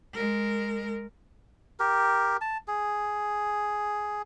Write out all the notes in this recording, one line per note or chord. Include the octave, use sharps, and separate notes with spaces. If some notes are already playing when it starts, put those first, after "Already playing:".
G#3 A#4
G4 A#4
A5
G#4